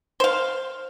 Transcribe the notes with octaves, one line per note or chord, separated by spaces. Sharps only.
C5 F5